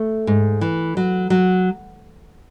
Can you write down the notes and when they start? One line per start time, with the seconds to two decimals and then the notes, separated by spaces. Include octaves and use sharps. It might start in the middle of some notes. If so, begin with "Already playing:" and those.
Already playing: A3
0.27 G#2
0.61 E3
0.97 F#3
1.30 F#3